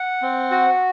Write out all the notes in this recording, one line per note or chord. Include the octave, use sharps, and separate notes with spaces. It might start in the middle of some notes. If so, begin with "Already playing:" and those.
Already playing: F#5
C4
F#4